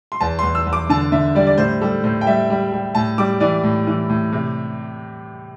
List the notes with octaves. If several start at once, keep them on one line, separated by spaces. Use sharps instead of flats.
C6
E2 A5
E2 C6
E6
E2
D6
D3 A5
D3 E5
G3 D5
D5
A2 C5
G3 A4
A2 C5
G5
G3 E5
G3
G3
A2 A5
G3 D6
E3 D5
A2
E3
A2
C3